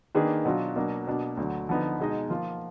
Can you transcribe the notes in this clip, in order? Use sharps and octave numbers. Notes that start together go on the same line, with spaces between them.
D#3 A#3 D4 G#4 B4
B2 F#3 D4 F4
B2 F#3 A#3 D4
B2 A#3 D4
D2 D3 F#3
D3 F3 B3 D#4
B2 G#3 D#4 G#4 D#5
F3 A#3 F4